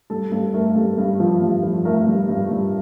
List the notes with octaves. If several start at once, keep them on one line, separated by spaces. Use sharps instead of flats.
G2 A4
G2 A4
A3 A#4
G2 A4
G2
F3
G2
F3
A3 A#4
G2
G2
G2